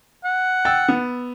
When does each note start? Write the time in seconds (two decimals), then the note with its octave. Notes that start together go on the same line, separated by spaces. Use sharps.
0.24 F#5
0.65 G5 E6 A6
0.88 B3